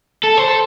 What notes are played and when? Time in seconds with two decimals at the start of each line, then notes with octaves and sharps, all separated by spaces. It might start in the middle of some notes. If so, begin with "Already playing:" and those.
0.24 A4
0.38 C5
0.48 A4